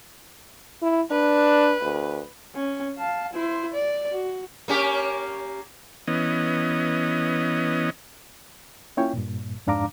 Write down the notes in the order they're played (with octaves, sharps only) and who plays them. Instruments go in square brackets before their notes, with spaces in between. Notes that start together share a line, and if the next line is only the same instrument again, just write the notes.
[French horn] E4
[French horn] D4 [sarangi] B4
[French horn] D2
[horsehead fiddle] C#4
F5 A5
E4 C5
D5
F#4
[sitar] A#3 C#4 G4
[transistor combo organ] E3 B3 C#4 D#5
[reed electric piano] A#3 C#4 E4 F4 C#5 G5
G2 A#2
F2 G#2 D4 F5 A#5 D6